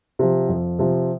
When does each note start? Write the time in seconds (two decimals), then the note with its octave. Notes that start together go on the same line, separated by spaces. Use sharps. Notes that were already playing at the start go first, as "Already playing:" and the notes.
0.19 C3 F3
0.49 F2
0.79 C3 F3